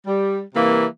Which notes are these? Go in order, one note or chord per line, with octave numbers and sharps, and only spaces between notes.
G3
C3 E3 G3 A#3